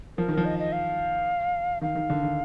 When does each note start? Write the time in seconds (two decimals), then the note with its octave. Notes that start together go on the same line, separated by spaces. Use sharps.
0.17 F3 A#4
0.28 D#3 A#4
0.37 F3
0.45 D#5
0.59 D#5
0.72 F5
1.81 D#3 F5
1.95 D#3
2.10 D3
2.23 D#3